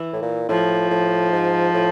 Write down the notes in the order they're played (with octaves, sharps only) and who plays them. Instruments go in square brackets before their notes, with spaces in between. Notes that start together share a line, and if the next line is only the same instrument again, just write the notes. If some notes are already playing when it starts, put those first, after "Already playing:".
Already playing: [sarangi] E3
[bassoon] A2
A#2
[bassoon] A2 [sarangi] F3
[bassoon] A2
G#2
A2